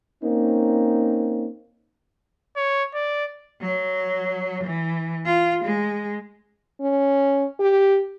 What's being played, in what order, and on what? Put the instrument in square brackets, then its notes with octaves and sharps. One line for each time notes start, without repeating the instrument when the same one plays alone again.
[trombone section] A#3 C4 C#4 D#4
[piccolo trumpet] C#5
D5
[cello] F#3
E3
F4
G#3
[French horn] C#4
G4